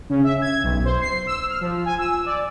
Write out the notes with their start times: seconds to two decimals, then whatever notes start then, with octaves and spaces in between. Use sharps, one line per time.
0.09 C#3
0.24 E5
0.42 G#6
0.63 B1
0.85 C5
1.01 C7
1.27 E6
1.49 F6
1.61 F3
1.86 G#5
1.98 E6
2.26 D5